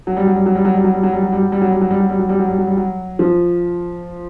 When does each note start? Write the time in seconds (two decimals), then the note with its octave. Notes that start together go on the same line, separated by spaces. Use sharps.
0.07 F#3
0.17 G3
0.27 F#3
0.36 G3
0.46 F#3
0.55 G3
0.65 F#3
0.74 G3
0.84 F#3
0.94 G3
1.03 F#3
1.13 G3
1.23 F#3
1.32 G3
1.42 F#3
1.52 G3
1.62 F#3
1.71 G3
1.81 F#3
1.91 G3
2.00 F#3
2.10 G3
2.19 F#3
2.29 G3
2.39 F#3
2.48 G3
2.58 F#3
2.67 G3
2.77 F#3
3.19 F3